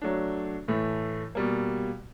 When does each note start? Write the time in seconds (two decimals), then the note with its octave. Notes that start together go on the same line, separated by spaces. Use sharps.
0.02 F#3 A3 D4
0.68 A2 E3 A3
1.35 B2 G3 A#3